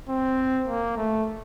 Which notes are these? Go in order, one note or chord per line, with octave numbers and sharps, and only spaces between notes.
C4
A#3
A3